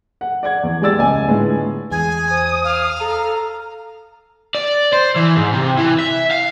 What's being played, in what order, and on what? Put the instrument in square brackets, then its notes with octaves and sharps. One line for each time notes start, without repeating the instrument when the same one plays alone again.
[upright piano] F#5
D5 F#5 G#6
E2
G#3 G4 D5 E6 A6
C#2 G#5
A2 D3 G#3 B3
[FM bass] E2 [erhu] G#4 [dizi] G#5
[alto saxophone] C5 [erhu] D#6
[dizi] F5
[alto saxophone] A4 [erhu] A#5
[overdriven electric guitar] D5
C5
E3
G#2
C3
E3
E5
F5